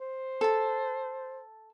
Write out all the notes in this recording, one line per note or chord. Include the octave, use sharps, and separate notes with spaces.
C5
A4 A5